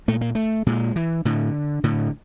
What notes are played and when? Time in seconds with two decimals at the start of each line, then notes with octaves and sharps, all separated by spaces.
0.08 A#2 A3
0.21 A#3
0.35 A3
0.66 A#2 G#3
0.96 E3
1.25 A2 D3
1.84 A2 D3